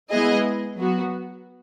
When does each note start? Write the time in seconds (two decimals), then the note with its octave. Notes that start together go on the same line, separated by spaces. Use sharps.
0.11 G#3 B3 E4 G#4 D#5
0.77 F#3 B3 F#4